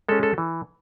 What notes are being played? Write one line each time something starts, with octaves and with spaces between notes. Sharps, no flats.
G#3 C#4 A4
A4
E3